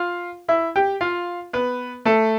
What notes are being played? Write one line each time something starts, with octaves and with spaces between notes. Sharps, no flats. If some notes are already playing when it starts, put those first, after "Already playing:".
Already playing: F4 F5
E4 E5
G4 G5
F4 F5
B3 B4
A3 A4